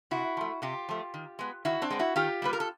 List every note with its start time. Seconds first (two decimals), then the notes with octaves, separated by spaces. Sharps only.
0.11 C3 E4 F#4
0.37 F3 A3
0.62 C3 F4 G4
0.89 F3 A3
1.14 D#3
1.39 G#3 B3
1.65 D#3 E4 F#4
1.82 C4 D4
1.90 G#3 B3
1.99 E4 F#4
2.16 D#3 F4 G4
2.42 G3 A#3 B4
2.53 A#4
2.60 A4